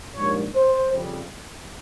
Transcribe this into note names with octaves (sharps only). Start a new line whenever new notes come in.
A#1 G#2 G3 A#3 C#5
C5
F2 C#3 G3